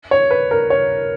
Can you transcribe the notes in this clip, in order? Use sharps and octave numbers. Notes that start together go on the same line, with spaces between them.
C#5
B4
A#4
C#5